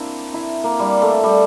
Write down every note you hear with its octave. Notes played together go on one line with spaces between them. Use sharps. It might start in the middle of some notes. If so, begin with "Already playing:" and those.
Already playing: A#3 C4 D4 E4
E4
A#3
G3
A3
G3